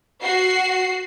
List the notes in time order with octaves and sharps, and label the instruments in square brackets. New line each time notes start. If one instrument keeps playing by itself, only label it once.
[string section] F#4 C7